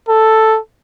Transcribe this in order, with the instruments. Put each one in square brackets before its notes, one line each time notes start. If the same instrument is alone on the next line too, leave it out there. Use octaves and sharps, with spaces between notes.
[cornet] A4